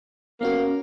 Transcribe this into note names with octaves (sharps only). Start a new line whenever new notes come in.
A#3 B3 C#4 F#4